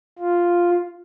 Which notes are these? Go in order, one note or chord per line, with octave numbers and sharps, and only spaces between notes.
F4